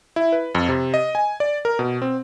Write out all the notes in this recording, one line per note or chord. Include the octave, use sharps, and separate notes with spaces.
E4
B4
F2
C3
D#5
G#5
D5
A#4
B2
C4